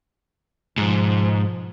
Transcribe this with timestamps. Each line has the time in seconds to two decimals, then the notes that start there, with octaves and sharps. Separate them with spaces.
0.78 G#2 B2 F3